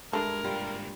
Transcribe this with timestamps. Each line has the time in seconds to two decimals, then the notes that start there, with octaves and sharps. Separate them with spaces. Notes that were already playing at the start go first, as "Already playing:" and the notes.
0.13 G2 G#3 A3 A4 A#4
0.44 G#2 G3 A#3 F4 G5